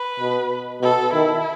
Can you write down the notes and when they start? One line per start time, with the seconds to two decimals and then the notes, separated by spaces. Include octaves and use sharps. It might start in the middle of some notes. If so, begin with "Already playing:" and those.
Already playing: B4
0.20 B2
0.82 B2 A4
1.13 D#3 E4